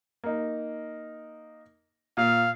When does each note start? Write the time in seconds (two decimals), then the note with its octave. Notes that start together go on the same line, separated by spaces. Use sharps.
0.24 A#3 D#4
2.17 A#2 F5